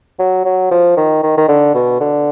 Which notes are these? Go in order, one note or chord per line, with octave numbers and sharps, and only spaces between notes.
F#3
F#3
F3
D#3
D#3
D#3
D3
B2
D3